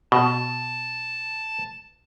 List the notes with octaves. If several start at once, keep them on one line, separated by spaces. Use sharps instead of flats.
B2 A5